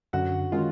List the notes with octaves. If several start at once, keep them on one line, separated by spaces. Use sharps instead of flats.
F#2 D3 F#3 F#4 F#5
D#3 G#3 C#4 F4